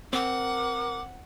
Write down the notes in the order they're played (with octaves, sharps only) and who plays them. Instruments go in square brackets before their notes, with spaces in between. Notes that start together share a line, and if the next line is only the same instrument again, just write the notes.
[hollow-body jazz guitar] C4 [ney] A#4 [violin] F#5 [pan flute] D6